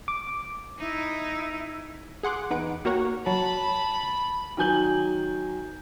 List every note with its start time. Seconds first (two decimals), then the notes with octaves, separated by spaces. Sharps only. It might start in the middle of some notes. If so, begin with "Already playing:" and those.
0.08 D6
0.79 D#4 E4
2.23 G#4 F#5 C6 D6 F#6
2.50 E2 D#4 B4 F#5 D7
2.85 A#3 F#4 G4 A#4 C#5 F#5
3.26 F#3 A5 B5
4.57 D#3 F#3 G#5 G6 F#7